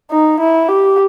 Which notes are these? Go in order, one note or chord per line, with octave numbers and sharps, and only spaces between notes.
D#4
E4
G4